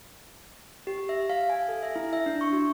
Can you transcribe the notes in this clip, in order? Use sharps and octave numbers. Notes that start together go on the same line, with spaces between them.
G4
E5
F5
G#5
A4
E5
E4
E5
D4
C#6
F#4